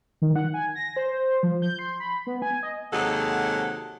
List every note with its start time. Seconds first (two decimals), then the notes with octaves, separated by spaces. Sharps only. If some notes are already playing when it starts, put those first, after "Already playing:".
0.22 D#3
0.36 F#5
0.54 G#5
0.75 A#6
0.97 C5
1.43 F3
1.62 G6
1.79 C6
2.00 B5
2.27 B3
2.42 G#5
2.63 D#5
2.92 D#2 C3 F#3 G#3 A4 F#5